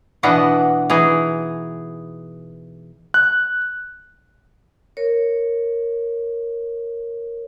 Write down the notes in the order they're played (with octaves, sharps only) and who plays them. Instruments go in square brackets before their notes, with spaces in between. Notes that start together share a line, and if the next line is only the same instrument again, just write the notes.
[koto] B2 E3 B3 D4 D#5 F#5
E3 D#4 G#4
[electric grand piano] F#6
[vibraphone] A#4 C#5